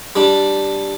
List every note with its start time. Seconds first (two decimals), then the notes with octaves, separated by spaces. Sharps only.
0.16 G3 D4